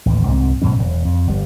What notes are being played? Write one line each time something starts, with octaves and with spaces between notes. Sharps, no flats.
A1 D#2
C2 G#2 G3 C4
G#2 B2 F#3 C#4
E1
F2
G1 G3